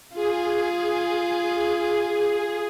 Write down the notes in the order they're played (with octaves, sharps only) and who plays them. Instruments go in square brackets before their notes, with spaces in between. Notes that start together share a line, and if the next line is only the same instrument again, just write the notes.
[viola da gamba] F4 [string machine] G#4